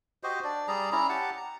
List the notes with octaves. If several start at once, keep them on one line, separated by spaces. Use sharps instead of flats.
F#4 G4 C5 D#5
D4 D5
G3 G#4 D5 A#5
C#4 E4 A#5
G4 F#5 A5
A#5